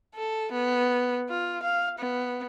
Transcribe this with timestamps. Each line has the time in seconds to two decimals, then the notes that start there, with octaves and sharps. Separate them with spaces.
0.15 A4
0.52 B3
1.29 F4
1.63 F5
1.99 B3